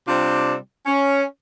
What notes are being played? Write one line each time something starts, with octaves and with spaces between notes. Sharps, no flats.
C3 G3 C4 D4 F4
C#4